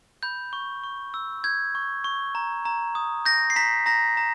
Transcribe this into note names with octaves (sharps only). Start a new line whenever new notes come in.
B5 G6
C#6
C#6
E6
G6 G#6
C#6
C#6
A#5
A#5
D#6
G6 A#6
C7
A#5 B6
A#5 A#6
A#5